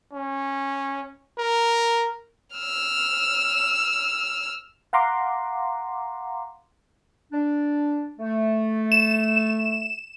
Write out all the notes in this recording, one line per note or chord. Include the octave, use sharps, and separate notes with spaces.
C#4
A#4
E6 F6
F5 F#5 A#5 C6 D6
D4
A3
E7